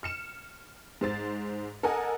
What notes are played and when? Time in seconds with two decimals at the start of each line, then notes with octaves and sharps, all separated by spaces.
0.03 F6 C#7 E7
1.01 G#2 C5 A6
1.83 A4 A#4 D#5 F#5 G#5